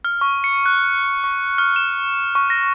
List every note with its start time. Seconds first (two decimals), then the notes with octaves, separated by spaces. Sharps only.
0.05 F6
0.21 C#6
0.44 C#7
0.66 F#6
1.24 C#6
1.58 F6
1.76 E7
2.35 C#6
2.50 A#6